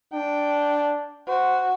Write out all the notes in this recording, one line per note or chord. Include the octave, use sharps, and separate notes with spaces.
D4 G5
F#4 C5